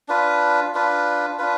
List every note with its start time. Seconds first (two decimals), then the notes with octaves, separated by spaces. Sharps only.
0.08 D4 F4 B4
0.74 D4 F4 B4
1.39 D4 F4 B4